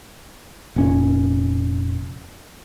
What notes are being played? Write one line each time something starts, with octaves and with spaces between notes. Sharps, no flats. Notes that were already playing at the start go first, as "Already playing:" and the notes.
F1 A#2 C#4